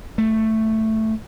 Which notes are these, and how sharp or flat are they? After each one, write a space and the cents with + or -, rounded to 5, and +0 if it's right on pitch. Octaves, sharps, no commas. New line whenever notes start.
A3 +5